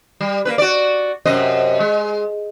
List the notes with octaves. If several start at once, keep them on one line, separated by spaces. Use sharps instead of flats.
G3
A#3 C#4 B4
F#4 D5
F#2 C3 D#5
G#3